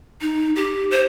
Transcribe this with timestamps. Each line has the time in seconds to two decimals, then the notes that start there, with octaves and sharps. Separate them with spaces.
0.21 D#4
0.56 G4
0.91 C5